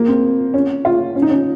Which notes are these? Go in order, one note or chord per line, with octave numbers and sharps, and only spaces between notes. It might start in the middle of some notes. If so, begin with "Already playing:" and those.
Already playing: A#3
C4
C#4
F4
C#4
D#4
C#4